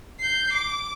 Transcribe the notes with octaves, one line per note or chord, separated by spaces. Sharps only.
G6 C7
D6